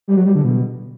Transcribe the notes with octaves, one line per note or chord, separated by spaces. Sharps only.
G3
F#3
G3
D3
B2